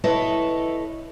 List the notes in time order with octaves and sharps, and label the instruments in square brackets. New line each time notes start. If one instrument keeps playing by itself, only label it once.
[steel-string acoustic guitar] E4 A4 B4 C#5 D#5 E5